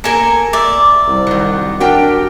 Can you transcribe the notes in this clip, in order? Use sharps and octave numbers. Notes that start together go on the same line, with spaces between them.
A#3 A4 A#4 G#5
D5 E5
C2 G3
D#3 F#3
D4 F#4 G4 A#4 G5